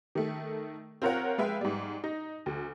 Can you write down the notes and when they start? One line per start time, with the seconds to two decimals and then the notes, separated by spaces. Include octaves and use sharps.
0.15 D#3 A3
1.02 C4 F4 A#4 C#5 F#5
1.38 G#3 B4 E5 F5 G5
1.61 G#2 G3
2.04 D#4
2.46 D2